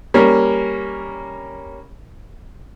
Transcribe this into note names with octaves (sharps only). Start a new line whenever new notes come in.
G3 A#3 C#4